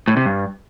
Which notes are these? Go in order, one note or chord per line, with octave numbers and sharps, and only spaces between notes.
A2
C3
G2